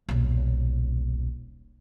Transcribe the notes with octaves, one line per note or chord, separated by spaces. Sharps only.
D#1 B1